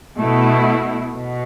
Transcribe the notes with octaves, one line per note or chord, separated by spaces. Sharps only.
B2 A3 E4
B2